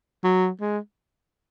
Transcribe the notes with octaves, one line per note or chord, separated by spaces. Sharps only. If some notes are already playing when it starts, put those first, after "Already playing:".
F#3
G#3